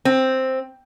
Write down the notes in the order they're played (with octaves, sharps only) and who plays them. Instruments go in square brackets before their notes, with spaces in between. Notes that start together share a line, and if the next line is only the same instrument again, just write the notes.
[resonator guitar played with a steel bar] C4